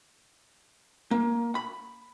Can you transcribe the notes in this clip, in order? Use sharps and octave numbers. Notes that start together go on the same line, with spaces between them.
A#3
B5